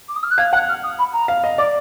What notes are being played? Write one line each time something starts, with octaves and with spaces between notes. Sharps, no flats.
D6
D#6
F6
F#6
F5 G#6
F#5 F#6
F6
D#6
B5
A#5
F5
D#5
D5 D6